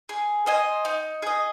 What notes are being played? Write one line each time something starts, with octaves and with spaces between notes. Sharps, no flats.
G#4
C5 D#5 G#5
D#4
G#4 D#5